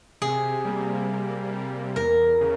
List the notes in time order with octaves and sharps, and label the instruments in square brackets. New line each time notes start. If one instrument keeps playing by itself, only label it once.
[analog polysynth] C3 [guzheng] G#4
[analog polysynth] G3 A#3
C3
G3 A#3
[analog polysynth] E2 [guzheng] A#4
[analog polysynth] C#3